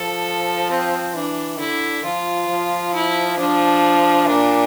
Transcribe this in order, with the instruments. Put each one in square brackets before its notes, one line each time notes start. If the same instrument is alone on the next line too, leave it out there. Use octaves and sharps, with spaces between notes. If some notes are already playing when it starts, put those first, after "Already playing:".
Already playing: [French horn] F3 [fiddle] A4
[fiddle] C4
[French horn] E3 [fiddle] D4
[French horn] D3 [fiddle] E4
[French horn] F3 [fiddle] F4
[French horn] F3
[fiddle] E4
[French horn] F3 [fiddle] D4
[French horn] A#2 [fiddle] D4